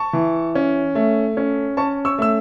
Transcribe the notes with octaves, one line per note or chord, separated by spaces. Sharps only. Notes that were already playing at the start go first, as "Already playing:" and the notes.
Already playing: A5 C#6
E3
C#4
A3
C#4
C#4 A5 C#6
C#6 E6
A3 E6